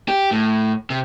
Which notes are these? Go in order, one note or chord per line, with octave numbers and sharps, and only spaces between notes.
G4
A2
C3